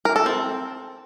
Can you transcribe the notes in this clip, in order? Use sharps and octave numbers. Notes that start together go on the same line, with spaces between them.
A#4
A4
C4